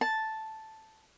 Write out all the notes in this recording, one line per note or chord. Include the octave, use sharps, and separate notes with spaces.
A5